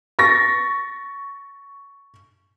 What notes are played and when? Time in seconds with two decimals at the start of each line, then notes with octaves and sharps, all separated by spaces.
0.19 C#6 A6 A#6